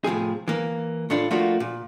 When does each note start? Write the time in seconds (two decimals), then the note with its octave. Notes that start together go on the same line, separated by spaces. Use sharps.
0.04 A2 C3 F3 G#4
0.48 E3 A#3
1.10 A2 A3 D4 F4
1.31 F3 A3 A#3 D4 F4 F#4
1.60 A#2